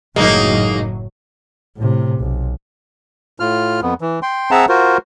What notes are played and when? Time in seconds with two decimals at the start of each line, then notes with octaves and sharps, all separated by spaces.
0.16 F#1 A2 F#3 G#3 A#3 D#4
1.77 A2 C3
2.21 B1
3.40 A2 F4 F6
3.82 F2 B3
4.01 E3
4.23 G5 C6
4.51 C4 G#4 E5 F#5 A5 A#5
4.69 F4 F#4 A#4 C5